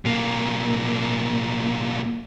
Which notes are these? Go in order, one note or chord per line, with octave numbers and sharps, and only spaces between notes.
B1 A#3